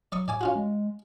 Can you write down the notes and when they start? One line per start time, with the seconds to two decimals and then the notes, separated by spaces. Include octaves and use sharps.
0.12 F#3 D5 C#6 D#6
0.28 A2 D5 G#5 D6
0.41 C#4 F4 F#4
0.55 G#3